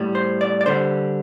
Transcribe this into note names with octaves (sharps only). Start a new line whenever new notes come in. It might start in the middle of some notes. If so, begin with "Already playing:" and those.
Already playing: A2 G3
C5
D5
D5
D3 G3 C5